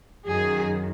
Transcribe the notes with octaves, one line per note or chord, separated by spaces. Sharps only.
F#2 D#3 G#4